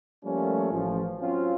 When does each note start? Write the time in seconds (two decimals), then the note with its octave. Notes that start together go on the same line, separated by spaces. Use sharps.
0.24 F3 G3 A3 A#3 C#4
0.72 A1 F3
1.20 F#3 C4 C#4 F4